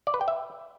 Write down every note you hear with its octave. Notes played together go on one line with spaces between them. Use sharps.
D5
B4
G5
E5